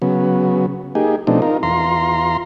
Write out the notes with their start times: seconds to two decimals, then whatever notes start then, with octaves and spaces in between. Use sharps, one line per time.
0.02 C#3 F#3 B3
0.95 A#3 D#4 G4 G#4
1.27 B2 F3 A3 C4 D4 D#4
1.42 D#4 F4 A#4
1.63 E2 F4 A#5 C6